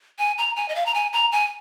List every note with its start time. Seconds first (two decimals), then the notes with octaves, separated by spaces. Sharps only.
0.19 G#5
0.38 A#5
0.56 G#5
0.69 D#5
0.75 F5
0.86 A#5
0.94 G#5
1.13 A#5
1.32 G#5